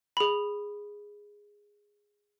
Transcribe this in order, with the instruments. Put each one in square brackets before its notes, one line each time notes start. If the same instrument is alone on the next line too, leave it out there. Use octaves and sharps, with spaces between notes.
[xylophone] G#4 B5